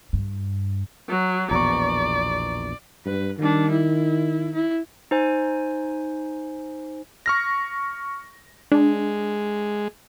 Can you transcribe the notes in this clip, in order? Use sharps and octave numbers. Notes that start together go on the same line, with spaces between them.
G2
F#3
A#1 E2 B2 D5 A#5 C#6
G2 B4
D#3 G3 D4
E4
E4
D#4 C5 G#5
C#6 F6 A#6
G#3 D4